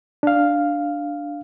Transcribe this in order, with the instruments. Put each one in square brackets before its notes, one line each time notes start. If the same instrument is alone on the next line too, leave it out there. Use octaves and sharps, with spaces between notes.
[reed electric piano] D4 F5